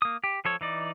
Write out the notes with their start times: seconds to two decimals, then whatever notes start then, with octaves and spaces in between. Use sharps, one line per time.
0.02 A#3 D#6
0.24 G4
0.45 F3 A4 C#5
0.61 E3 D#4 D5